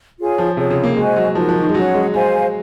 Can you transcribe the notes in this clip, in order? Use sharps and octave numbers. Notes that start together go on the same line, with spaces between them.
F4 G#4 C#5 G#5
F3
C3 F4 G#4 C#5
C#3
A#3
G#3 F#4 C5 D#5 G#5
F#3
F3 D#4 F#4 A#4
F3
D#3
G#3
F#3 C#4 G#4 C#5 F#5
G#3
G#3 C5 F5 G#5